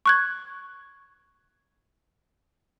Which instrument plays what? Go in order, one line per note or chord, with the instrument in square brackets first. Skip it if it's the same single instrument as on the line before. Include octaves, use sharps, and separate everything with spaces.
[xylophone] C#6 F#6 G#6